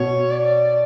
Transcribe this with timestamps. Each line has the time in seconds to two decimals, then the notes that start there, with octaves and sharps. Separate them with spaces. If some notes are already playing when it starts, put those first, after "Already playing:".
Already playing: B2 C#5
0.31 D5